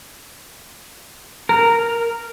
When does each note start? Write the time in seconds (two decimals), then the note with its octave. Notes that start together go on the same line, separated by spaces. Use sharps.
1.49 A#4